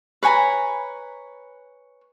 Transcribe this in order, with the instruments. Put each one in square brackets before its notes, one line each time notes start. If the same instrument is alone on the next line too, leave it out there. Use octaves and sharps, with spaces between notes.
[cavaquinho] B4 C#5 G#5 A#5